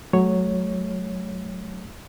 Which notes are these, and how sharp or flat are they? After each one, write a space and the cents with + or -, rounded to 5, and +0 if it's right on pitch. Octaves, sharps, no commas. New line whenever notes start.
F#3 +0 A3 -30 C#5 +0